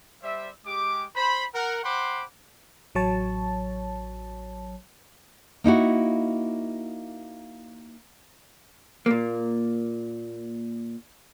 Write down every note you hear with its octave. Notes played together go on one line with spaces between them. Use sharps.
G3 C5 D5 E5
G#3 G4 D6
C5 B5
A#4 F#5
C5 F#5 G5 B5 C6 D6
A1 F#3 C#5 A5
A#3 D#4 E4 F#4
A#2 A#3